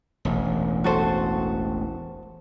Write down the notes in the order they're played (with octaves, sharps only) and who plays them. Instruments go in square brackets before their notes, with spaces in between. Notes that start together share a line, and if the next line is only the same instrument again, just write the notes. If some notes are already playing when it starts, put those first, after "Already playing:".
[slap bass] E1 A1
[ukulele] F#4 A4 C5